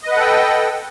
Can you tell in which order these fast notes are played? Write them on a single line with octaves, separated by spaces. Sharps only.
D#5 B4 F#5 A4 G5